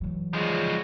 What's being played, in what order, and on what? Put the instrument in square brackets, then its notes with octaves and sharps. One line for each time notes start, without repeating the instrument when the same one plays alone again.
[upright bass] E3 F#3
[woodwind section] C#3 G3 F#4 [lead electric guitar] F3 G#3